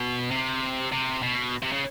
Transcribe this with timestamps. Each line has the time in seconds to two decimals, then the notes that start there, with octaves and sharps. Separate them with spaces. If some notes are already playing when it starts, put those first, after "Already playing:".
Already playing: B2
0.31 C3
0.92 C3
1.22 B2
1.63 C3
1.72 C#3